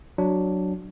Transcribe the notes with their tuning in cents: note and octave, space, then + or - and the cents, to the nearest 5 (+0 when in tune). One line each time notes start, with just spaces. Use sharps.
F#3 +0 D4 +0